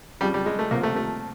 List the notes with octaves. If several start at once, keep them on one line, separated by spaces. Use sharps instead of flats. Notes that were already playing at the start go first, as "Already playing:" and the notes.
F2 C#3 F3 G3
G3
G#3
A3
C2 C3 F3 A#3
A3
A3